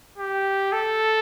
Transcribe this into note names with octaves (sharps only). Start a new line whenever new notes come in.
G4
A4